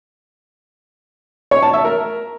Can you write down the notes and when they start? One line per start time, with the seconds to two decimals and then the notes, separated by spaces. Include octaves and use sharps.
1.51 C#5
1.62 A5
1.73 E5
1.85 A#4